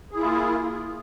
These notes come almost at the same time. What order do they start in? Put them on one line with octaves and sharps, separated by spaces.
G#4 E4 F4 A#3